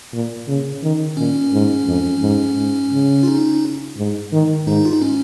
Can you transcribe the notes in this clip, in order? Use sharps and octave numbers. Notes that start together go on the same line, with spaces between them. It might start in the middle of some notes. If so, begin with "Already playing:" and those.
A#2
C#3
D#3
A#2 C#4
G#2
F2
G#2
G#2
C#3
F4
D#4
G#2
D#3
G#2 D#4
F4
D#4
C#4